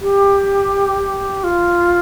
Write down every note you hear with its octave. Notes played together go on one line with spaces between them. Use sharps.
G4
F4